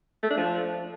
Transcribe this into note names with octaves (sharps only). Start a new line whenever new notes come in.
A3
D4
F3